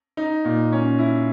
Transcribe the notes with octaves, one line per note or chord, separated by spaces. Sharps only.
D#4
A#2
C#4
E4